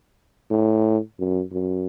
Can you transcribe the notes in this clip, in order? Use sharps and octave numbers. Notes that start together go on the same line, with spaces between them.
A2
F#2
F#2